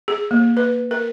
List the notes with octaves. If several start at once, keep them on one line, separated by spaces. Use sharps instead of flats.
G#4
A#3
B4
A#4